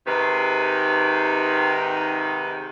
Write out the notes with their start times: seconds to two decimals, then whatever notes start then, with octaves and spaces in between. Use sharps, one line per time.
0.08 G#2 C3 D#3 B4